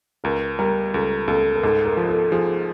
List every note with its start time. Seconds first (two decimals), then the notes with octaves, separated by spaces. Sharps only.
0.24 C#2 A#4
0.59 G3 A#4
0.94 C#2 A4
1.28 C#2 A4
1.56 A#4
1.63 G#2 A4
1.85 A#4
1.97 F3
2.09 A4
2.32 F3 G#4